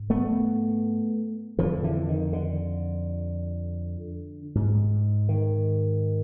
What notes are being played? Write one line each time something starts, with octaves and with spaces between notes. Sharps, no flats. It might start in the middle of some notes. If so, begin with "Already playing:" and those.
Already playing: G#2
A3 B3
F2 D3 D#3 F3
D3 E3
D#3
D3
G#2
D#3